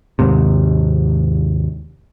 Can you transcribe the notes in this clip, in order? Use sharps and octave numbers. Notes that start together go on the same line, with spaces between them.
D#2 G#2 C3